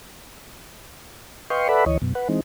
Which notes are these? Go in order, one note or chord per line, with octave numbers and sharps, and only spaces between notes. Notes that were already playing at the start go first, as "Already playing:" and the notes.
B4 D#5 F5 G5 C6 C#6
A4 B4 D5 E5 F#5 B5
D2 E3 C#5 D#5
F#2 B2
B4 F#5
E3 G#3 C4 D#4